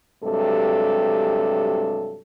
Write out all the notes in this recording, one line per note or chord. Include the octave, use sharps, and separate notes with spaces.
G2 C3 F#3 G#3 A4